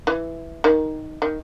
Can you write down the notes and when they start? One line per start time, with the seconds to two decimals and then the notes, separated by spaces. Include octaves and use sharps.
0.07 E3
0.64 D#3
1.22 D#3